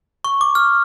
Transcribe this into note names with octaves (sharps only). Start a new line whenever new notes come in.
C#6
D6
F6